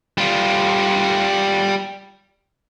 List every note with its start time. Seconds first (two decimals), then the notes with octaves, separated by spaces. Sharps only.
0.18 G3 F4